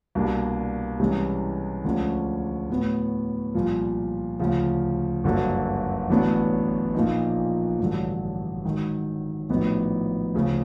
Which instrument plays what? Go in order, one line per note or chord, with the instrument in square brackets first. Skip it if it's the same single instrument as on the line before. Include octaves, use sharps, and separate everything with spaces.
[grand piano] C2 B2 G3 A#3 D4
C2 C3 E3 G#3 C#4
D2 D3 F3 G#3 C#4
A2 F#3 B3
C2 A#2 F3
D2 C#3 F3
G1 F#2 D3 F#3 A#3
A1 A2 F#3 B3 D4
A#1 A#2 F3 A#3 D#4
A1 G2 D3 F#3
G#2 D#3 F#3
A#1 A2 F#3 B3 D#4
D2 C#3 F3